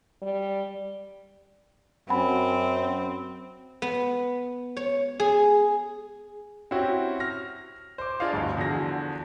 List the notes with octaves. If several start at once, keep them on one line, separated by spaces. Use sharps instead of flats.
G3
F#2 C4 F#5 G#5 B5
B3
C#5
G#4
C4 C#4 E4 F#4 G4
F6 A#6
C5 D6
D4 F4 G#4 D#5 F5
G1 D2 G2
E2 D3 F3 F#4 G#4 A#6